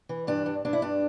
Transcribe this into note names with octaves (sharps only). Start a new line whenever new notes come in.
E3
G2 D4
G2
G2 D4
E4
G2 D4